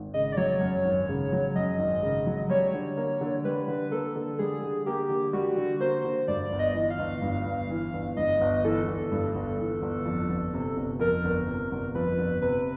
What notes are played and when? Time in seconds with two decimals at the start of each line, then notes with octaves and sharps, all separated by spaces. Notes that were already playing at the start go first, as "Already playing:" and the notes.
Already playing: G#1
0.14 C#3 D#5
0.32 D5
0.37 F#3 C#5
0.61 F#2
0.85 G#1
1.09 C#3
1.32 F#3
1.55 F#2 D#5
1.79 G#1
2.03 C#3
2.26 F#3
2.49 G3 C#5
2.73 D3
2.97 A#3
3.21 D3
3.44 G3 B4
3.68 D3
3.91 A#3 A4
4.16 D3
4.39 G3 G#4
4.63 D3
4.86 A#3 G4
5.09 D3
5.33 G3 F#4
5.57 D3
5.80 A#3 C5
6.04 D3
6.28 G2 D5
6.52 G1
6.59 D#5
6.75 E3
6.90 F5
6.99 G1
7.22 G2
7.45 G1
7.70 E3
7.94 G1
8.17 G2 D#5
8.41 G1
8.64 E3 A4
8.87 G1
9.12 G2
9.35 G1
9.59 E3
9.82 G1
10.05 F2
10.29 G1
10.54 C3
10.77 G1
11.00 F2 A#4
11.24 G1
11.47 C3
11.72 G1
11.95 F2 B4
12.18 G1
12.42 C3 B4